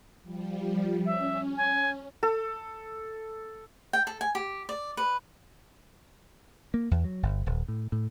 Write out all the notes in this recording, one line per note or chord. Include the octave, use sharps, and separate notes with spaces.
F3 G3
C#4 E5
G#5
A4
G5
A4
G#5
G4
D5
B4
A#3
E2
F#3
G1
D#1
A2
A2